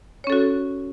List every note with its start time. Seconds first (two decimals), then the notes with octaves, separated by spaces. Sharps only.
0.24 C#5
0.27 C#4
0.30 A4
0.32 F#4